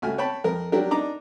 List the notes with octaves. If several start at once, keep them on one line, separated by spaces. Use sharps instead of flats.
C#2 A3 F#4 G#5 F6
C#5 G5 A5 B5
F2 A#4
F#3 D4 G4 A#4
D4 D#4 A#5 D6